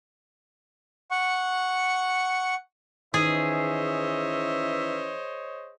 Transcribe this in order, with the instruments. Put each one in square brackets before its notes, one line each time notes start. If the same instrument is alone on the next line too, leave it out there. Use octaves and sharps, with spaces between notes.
[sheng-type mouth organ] F#5 C#6
[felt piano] D#3 [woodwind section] E3 C#4 E5 [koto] G#4 [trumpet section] C5 C#5 D#5